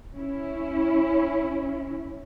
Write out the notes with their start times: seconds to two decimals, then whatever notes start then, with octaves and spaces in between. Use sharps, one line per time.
0.15 C#4 E4